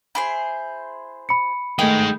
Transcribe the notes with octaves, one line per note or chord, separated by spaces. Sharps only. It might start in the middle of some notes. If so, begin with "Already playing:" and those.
E4 G#4 C5
B5 C#7
D#3 G#3 A3 D#4 G5